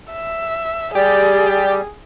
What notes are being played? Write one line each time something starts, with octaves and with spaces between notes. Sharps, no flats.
E5
G3 G4 G#4 D5